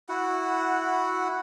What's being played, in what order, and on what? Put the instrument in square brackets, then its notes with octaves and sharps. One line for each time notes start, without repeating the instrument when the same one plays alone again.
[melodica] E4 F#4 F#5